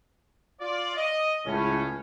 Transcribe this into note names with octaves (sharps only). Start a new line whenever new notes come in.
F4 D5
D#5
C#2 A2 C#4